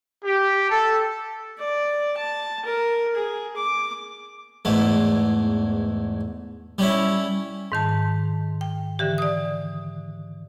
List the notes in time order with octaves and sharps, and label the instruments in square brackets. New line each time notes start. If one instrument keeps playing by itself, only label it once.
[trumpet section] G4
A4
[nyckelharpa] D5
A5
A#4
G#4
D6
[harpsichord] E2 G#2 A3
G3 C#4 E4
[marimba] G#2 D#3 A5
G5
D3 E3 G4
D5 D#6